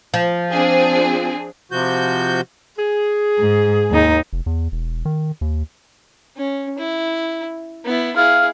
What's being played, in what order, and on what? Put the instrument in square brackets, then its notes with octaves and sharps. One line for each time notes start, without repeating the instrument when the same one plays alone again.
[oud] F3
[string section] C4 D4 G#4
[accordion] C3 F3 F#4 G6
[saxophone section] G#4
[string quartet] G#2
D#2 D#4
[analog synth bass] F1
E2
E1
D#3
D#2
[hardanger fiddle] C#4
E4
B3 E4
[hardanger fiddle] E4 G#4 [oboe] F5